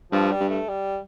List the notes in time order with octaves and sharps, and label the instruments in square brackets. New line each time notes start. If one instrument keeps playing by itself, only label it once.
[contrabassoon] G2 [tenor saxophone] F3
[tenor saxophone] G3
[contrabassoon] G2
[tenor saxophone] A3
G3